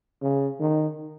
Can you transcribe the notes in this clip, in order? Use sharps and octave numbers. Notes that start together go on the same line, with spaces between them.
C#3
D#3